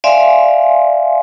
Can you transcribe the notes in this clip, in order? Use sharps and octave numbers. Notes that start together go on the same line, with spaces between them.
D5 E5 F5 G#5 C6